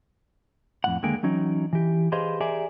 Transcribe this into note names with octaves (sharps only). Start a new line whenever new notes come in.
F2 A2 F#5
D#2 D3 G#3 A#3 G5 G#5
E3 F#3 C#4 D#4
E3 G4
G4 G#4 B4 C5 D#5 F5
G4 G#4 A#4 D5 E5 G#5